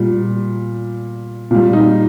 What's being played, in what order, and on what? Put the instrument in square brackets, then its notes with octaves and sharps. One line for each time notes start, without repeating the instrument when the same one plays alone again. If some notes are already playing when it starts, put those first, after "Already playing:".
Already playing: [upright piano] A#2 G3
A#2 G3 F4
D#4